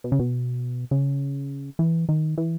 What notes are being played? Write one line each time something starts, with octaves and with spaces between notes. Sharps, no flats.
B2
C#3
B2
C#3
E3
D#3
E3